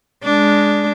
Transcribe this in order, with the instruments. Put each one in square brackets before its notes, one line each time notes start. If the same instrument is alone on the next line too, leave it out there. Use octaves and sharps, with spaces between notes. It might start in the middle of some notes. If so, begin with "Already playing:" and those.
[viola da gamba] G#3 D4